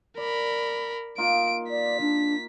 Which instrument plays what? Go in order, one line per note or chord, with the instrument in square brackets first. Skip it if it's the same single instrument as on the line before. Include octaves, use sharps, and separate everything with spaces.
[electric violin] A#4 B5 [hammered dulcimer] D5
[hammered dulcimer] A#3 D#4 F4 [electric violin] D7
[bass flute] D5 [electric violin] B6
[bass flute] D4